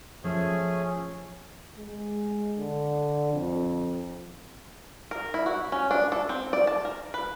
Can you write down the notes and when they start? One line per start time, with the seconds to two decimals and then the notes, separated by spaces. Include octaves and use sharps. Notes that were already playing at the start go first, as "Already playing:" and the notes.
0.24 F3 A3 C#4 G#4 C5
1.78 G#3
2.57 D3
3.34 F2
5.11 A#4
5.34 E4
5.46 F#4
5.72 C#4
5.91 D4
6.12 A4
6.29 C4
6.53 D5
6.67 A5
6.85 A#4
7.14 B4